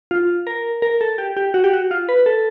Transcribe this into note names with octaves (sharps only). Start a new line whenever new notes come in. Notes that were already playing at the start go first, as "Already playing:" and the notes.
F4
A#4
A#4
A4
G4
G4
F#4
G4
F#4
F4
B4
A4